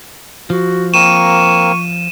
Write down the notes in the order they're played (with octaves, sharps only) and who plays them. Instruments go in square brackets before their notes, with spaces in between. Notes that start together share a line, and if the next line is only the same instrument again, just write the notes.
[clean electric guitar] F3 [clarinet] F#4
[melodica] A#3 C4 A#4 [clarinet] C#6 [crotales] D#7 E7